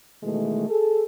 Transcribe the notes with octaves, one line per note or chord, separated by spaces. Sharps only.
B2 D#3 E3 G#3 A3
G#4 A4